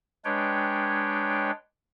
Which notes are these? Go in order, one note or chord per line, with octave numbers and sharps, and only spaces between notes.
G#3 D4 B4 C#5 G5